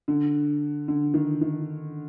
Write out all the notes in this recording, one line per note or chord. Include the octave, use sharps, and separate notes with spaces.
D3
D3
D#3
D#3